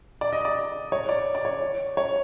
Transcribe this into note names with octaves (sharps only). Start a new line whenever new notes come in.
D5
D#5
D5
C#5
D5
D5
C#5
C#5